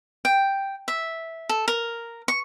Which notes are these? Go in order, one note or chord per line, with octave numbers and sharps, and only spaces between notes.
G5
E5
A4
A#4
C#6